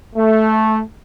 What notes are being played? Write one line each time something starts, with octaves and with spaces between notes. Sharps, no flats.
A3